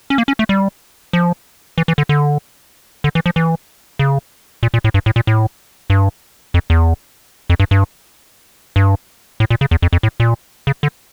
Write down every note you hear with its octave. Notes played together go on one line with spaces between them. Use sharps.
C#4
A#3
C#4
A3
G3
F3
E3
E3
D3
D3
D3
E3
F3
E3
C#3
A#2
A#2
A2
G2
A2
A#2
A2
G2
F2
E2
F2
G2
G2
G2
A2
A#2
C#3
E2
F2
F2
A2
A#2
C#3
D3